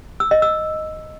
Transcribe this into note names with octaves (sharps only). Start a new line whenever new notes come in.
E6
D#5
E6